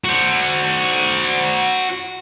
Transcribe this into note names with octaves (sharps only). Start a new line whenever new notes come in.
F#4 C5